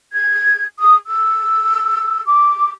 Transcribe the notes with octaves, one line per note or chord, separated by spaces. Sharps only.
G#6
D#6
E6
D6